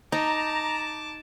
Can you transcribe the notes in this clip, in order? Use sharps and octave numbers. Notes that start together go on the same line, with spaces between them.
D#4 A5 A#5 D6